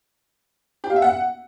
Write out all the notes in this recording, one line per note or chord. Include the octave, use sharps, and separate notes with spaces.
G4
F5
E5
F#5